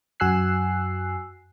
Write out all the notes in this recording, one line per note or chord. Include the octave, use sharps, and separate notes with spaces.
F#2 F#4 G#5 E6 F#6 C7